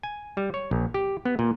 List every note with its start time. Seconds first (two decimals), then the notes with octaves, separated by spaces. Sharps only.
0.03 G#5
0.37 G3
0.54 C#5
0.71 A#1
0.94 G4
1.25 B3
1.39 A#2